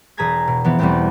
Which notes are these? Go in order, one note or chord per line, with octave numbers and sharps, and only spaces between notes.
E1 G#4 A5 A#5 G#6 B6
B2
E3 F3 B3
E2 B2 G3 A3 B3 C4